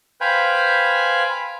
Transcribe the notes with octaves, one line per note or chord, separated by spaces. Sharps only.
B4 C5 F5 G5 G#5 B5